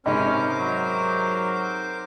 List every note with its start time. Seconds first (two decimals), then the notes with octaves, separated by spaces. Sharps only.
0.06 G#2 C3 C#4 A#4 C5 D#5 B5 D6
0.59 F#3